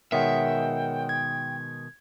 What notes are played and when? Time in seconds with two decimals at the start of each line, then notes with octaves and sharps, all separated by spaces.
0.12 B2 D#3 G#3 A#4 C#5 E5 F#5 G5
1.09 G#6